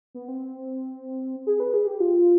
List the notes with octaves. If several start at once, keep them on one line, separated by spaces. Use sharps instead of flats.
B3
C4
G#4
B4
G#4
G4
F4